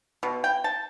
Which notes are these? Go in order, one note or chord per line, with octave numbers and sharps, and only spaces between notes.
B2
G5
A5